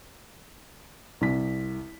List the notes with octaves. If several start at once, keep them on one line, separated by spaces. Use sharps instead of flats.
C2 B6